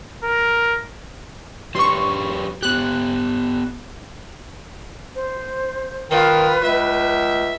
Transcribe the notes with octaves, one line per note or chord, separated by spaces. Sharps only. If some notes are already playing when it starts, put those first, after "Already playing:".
A#4
F#3 G4 B4 C6 C#6
B3 G4 F#6
C5
D#3 F4 B4
C#2 E5